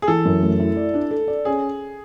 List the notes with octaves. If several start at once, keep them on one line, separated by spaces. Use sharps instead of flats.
G#4
E3 A4
F#2
A3
E4
D5
D4
A4
D5
C#4 G#4